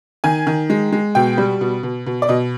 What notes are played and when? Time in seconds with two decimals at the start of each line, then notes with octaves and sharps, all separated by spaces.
0.24 D#3 G#5
0.47 D#3
0.70 G#3
0.92 G#3
1.15 B2 G5
1.38 G3
1.61 B2
1.83 B2
2.06 B2
2.22 D5
2.29 B2 D#5